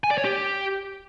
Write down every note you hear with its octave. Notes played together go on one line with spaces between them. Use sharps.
G#5
D5
C#5
G4